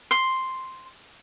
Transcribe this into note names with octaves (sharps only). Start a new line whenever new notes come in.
C6